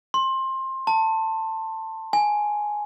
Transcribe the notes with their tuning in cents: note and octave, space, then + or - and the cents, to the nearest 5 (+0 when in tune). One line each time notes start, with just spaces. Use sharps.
C6 +20
A5 +15
G#5 +5